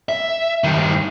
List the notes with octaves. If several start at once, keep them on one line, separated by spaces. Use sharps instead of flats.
E5
G2 D#3